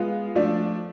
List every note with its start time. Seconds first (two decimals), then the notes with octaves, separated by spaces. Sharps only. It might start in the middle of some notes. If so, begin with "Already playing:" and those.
Already playing: G#3 B3 F4
0.35 F3 A3 D4